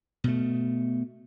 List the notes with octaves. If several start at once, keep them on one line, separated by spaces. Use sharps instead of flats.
B2 A3